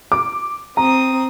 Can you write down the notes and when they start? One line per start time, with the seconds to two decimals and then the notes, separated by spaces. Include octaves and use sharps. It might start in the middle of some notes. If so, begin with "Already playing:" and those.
0.12 D6
0.77 C4 A#5 D#6